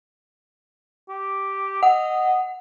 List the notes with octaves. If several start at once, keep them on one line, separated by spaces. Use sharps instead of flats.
G4
D#5 F#5